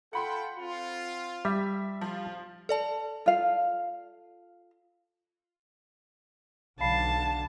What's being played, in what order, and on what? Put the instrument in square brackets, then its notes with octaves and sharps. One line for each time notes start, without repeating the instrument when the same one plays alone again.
[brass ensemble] F4 A4 G5 [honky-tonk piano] F#5 B5 C6
[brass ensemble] C4 F4
[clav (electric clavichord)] G3 [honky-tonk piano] E5
[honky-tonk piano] F3 [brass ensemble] F4
[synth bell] A4 D5 A5
[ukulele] F4 F5
[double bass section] B1 D3 [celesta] F5 B5 C7 [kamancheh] A5